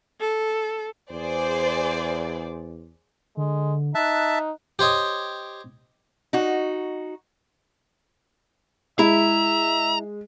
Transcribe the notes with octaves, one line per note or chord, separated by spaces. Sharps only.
A4
E2 G#4 C5 D5
D3 G#3
D#4 E5 A5 F#6
G4 C5 C#5 D#5
D#4 F#4
G#3 E4 E5 A#5